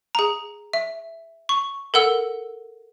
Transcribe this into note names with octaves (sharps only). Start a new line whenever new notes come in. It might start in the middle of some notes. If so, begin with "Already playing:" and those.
G#4 A#5
E5
C#6
A4 A#4 F#5 E6